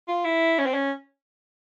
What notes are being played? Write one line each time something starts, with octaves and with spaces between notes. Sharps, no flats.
F4
E4
C#4
C4
C#4